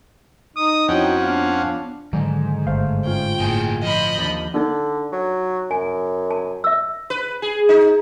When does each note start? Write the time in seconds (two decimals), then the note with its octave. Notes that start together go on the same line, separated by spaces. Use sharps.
0.56 D#4 D#6
0.88 F2 C#4 E4 F#4 C#5 F#5 G5
1.23 B3 D4 F4 F5
2.13 G#2 D3 D#3 F#3 G#3
2.67 G1 A3 C5 F5
3.05 C#4 F4 G5
3.40 G1 A2 A#3 G#4
3.83 F3 D#5 B5
4.17 D#2 D4 A6
4.54 D3 D4 D#4
5.12 F#3
5.71 F#2 G#5
6.31 A5
6.64 E5 E6
7.10 B4
7.42 G#4
7.69 D#4